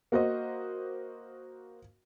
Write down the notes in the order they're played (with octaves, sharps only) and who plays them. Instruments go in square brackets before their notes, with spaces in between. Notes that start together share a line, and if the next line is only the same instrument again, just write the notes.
[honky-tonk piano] A#3 F#4 C5 D#5